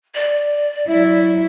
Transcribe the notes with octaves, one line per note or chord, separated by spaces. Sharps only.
D5
F#3 E4